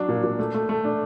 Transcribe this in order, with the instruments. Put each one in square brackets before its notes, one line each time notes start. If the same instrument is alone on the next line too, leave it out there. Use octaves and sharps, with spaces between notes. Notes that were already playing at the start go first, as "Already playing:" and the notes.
Already playing: [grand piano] F#3 D4
A#2
A#2
A3
A3
A3
D4